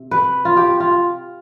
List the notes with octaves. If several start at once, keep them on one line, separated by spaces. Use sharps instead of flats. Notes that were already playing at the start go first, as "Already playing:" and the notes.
Already playing: C3
B4
F4
G4
F4